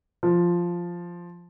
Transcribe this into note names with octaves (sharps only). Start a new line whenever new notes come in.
F3